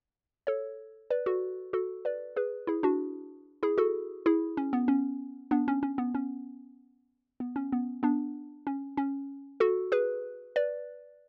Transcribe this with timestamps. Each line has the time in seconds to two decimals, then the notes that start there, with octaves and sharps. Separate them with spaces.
0.47 A4 C#5
1.10 B4 D5
1.26 F#4 A4
1.73 F#4 A4
2.05 B4 D5
2.36 G#4 B4
2.67 E4 G#4
2.83 D4 F#4
3.63 E4 G#4
3.78 F#4 A4
4.26 E4 G#4
4.57 C#4
4.73 B3
4.88 C#4
5.51 B3 D4
5.68 C#4
5.83 C#4
5.98 B3
6.15 C#4
7.40 B3
7.56 C#4
7.72 B3
8.03 B3 D4
8.67 C#4
8.97 C#4
9.60 F#4 A4
9.92 G#4 B4
10.56 B4 D5